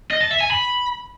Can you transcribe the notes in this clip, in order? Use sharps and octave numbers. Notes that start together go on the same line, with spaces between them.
D#5
A5
E5
G#5
B5